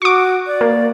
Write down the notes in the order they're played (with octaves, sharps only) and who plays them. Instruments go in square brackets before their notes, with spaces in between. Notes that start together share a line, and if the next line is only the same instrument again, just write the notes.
[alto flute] F#4 [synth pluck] C#6 D6
[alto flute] D5
[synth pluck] A#3